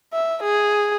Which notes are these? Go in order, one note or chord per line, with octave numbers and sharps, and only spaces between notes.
E5
G#4